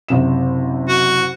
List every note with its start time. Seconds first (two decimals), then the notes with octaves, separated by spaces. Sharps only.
0.08 F#1 C3 E7
0.89 F#4